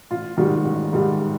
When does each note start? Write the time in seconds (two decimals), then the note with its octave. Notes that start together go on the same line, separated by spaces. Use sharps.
0.11 A1 F4
0.37 G#2 D#3 G3 F#4
0.65 A1
0.93 G#2 D#3 G3